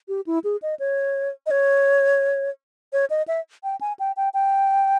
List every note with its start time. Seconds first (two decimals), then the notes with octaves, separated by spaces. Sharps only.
0.08 G4
0.26 E4
0.44 G#4
0.62 D#5
0.79 C#5
1.46 D#5
1.51 C#5
2.93 C#5
3.10 D#5
3.28 E5
3.63 G5
3.81 G#5
3.99 G5
4.16 G5
4.34 G5